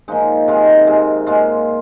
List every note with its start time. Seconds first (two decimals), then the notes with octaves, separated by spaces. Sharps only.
0.08 A#2 F3 G#3 D#4
0.48 C3 D#3 G#3 F4
0.87 C3 G#3
1.26 A#2 G#3 F4